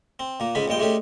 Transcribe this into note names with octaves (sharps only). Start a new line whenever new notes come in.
C4
A#2 A#3
C#2 G#2 G#3 C#4 B5
A#1 G2 G#3 G5
G#3 A3 C#4 D4 G4